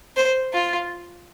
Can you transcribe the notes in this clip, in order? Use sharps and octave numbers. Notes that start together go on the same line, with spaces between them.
C5
F4